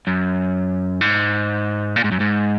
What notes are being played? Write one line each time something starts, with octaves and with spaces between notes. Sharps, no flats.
F#2
G#2
A#2
G#2
F#2
G#2